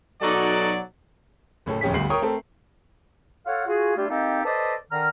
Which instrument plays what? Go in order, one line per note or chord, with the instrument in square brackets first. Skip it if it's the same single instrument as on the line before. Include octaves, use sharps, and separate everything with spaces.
[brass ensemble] B1 F#3 D5 [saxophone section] D#4 F#4 A4
[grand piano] F#1 A2 C#4 A4
D1 F2 C#4 G4 G#4 B6
G1 D2 G3 C7 F#7
A#4 C#5 G5 C#6 D#6
A3 C4 A4 A#4
[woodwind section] F4 A4 C#5 F5 F#5
F4 F#4 G#4
G3 A3 D4 E4 F4 G4
A#3 C4 D#4 G4 A4 D#5
A4 B4 C5 D5 D#5
D3 D#3 A#5 F6